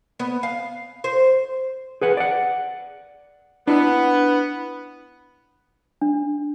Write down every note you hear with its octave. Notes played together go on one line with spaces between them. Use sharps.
B3
F5
C5
G#4 B4 F#5
D5 F#5
B3 D4 E4
D4